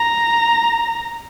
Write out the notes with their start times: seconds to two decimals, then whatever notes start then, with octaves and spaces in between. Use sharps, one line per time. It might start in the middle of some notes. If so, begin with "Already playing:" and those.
Already playing: A#5